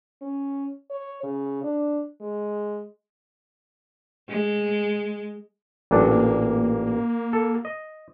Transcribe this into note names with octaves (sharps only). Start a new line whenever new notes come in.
C#4
C#5
C#3
D4
G#3
G#3
A1 A#2 F#3 D4
A#3
A4
D#5